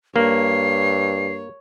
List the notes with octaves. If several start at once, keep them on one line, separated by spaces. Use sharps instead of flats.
G2 A#3 C#5 C7